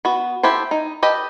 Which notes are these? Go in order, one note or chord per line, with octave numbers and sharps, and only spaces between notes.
B3 F#4
E4 G4 A4 C5
D#4
G4 A4 B4 D#5